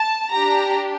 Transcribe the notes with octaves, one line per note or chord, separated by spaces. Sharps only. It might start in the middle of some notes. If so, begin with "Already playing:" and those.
Already playing: A5
D4 G4 A#5